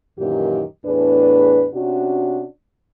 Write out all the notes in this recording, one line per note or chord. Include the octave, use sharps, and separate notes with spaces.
F#2 A#2 D#3 E3 D#4 G4
E2 A2 D4 G#4 B4
C3 C#4 D4 F#4